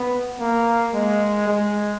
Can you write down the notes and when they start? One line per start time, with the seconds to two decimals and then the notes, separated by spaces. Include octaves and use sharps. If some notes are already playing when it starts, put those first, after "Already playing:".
Already playing: B3
0.39 A#3
0.94 G#3
1.47 G#3